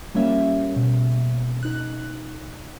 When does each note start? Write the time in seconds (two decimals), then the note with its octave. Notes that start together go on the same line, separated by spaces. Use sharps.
0.15 F3 G3 A#3 C#4 E5
0.76 B2
1.63 D#4 F#6